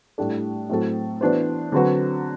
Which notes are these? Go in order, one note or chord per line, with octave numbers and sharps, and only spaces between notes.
A2 G3 D4 A4
A2 F#3 C4 F#4 A4
E3 B3 D4 F#4 C5
D3 F#3 C4 F#4 B4